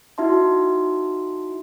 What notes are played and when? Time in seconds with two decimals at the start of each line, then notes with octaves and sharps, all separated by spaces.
0.18 D#4 E4 F#4 E5 A5 C6